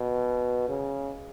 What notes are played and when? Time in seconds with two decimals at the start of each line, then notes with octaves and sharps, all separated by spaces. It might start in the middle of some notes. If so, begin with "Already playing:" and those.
Already playing: B2
0.69 C#3